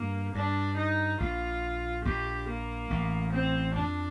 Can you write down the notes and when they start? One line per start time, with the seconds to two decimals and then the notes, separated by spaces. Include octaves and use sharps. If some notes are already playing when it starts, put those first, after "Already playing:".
Already playing: G2 A#3
0.35 G2 D4
0.77 D#4
1.20 A#1 A#2 F4
2.05 A#1 A#2 G4
2.48 A#3
2.90 A1 A2
3.33 C4
3.75 F2 D4